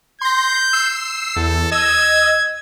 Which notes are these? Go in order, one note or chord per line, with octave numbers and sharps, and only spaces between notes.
C6 G6 A#6
E6 C7
E2 A4
D#5 E6 G#6